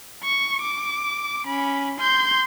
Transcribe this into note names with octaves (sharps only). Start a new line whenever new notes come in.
C#6
D6
C#4 B5
C6 G6